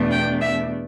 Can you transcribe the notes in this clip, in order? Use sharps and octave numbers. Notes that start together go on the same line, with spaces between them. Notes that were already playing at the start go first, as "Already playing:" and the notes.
Already playing: E2 B2 A3 D4
G5
E5